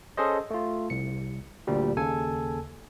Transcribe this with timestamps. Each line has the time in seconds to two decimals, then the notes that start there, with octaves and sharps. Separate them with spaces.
0.17 C#4 G#4 A4 C5 D#5
0.51 A3 F4
0.90 C2 C#7
1.67 D2 A#2 G3
1.97 D#2 C#3 A4 G#5